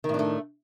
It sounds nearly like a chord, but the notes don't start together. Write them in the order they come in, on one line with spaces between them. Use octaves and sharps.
D#3 A2 D4 A3